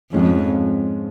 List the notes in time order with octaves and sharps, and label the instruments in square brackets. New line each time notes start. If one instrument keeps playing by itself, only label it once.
[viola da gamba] F2 [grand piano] G#2 F3 G#3 C#4